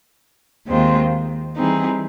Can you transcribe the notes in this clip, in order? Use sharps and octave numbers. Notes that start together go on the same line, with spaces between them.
D#2 D#3 G#3 C4 F4
E3 G3 C4 D#4 G#4